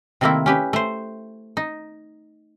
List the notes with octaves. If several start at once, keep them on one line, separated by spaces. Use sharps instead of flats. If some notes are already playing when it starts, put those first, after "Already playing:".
C3 D#3 A3 A#3 C4 E4
C#4 G4 B4
A3 C5
D#4